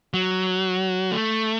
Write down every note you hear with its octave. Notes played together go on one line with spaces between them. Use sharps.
F#3
A3